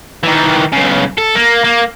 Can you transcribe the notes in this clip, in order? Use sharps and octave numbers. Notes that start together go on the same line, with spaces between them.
D#3 E3
B1 C#3
A4
A#3
A#3